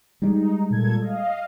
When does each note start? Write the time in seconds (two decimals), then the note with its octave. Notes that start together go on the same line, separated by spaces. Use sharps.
0.22 G3 G#3 D#4
0.70 A#2 A4 G#6
1.02 D#5 F5